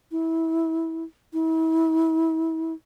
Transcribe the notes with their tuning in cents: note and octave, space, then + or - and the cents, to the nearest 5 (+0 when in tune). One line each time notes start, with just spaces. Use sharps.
E4 -20
E4 -35